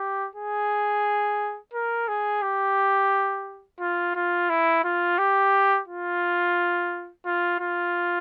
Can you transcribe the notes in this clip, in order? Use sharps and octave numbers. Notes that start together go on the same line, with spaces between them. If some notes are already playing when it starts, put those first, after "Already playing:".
Already playing: G4
G#4
A#4
G#4
G4
F4
F4
E4
F4
G4
F4
F4
F4